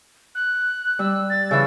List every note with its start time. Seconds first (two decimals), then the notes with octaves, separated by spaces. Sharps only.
0.35 F#6
0.99 G3 E6
1.30 A6
1.51 C#3 E3 E6